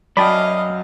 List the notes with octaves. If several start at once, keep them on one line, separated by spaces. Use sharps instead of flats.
F#2 D5 D#5 F5 G5 A5 B5